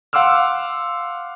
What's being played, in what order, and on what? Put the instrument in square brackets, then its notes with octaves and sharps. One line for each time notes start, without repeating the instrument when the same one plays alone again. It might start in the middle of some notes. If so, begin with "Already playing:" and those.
[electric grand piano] F5 F#5 C6 D6 E6 F6